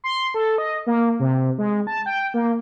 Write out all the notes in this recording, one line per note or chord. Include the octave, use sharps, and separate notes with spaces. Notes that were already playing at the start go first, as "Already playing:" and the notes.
C6
A4
D#5
A#3
C3
G#3
A5
G5
A#3